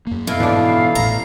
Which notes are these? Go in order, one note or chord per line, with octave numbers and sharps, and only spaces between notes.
F#2 A#3
B2 E4 A4 F5
G#2 E3 D4
A1 A2 A#5